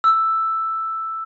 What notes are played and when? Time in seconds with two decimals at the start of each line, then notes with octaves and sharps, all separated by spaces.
0.04 E6